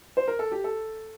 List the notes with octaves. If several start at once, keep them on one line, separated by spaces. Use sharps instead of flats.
C5
A#4
A4
G4
A4